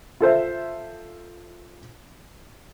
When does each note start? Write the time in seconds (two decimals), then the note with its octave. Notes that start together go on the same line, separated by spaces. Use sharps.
0.21 F4 A4 C5 E5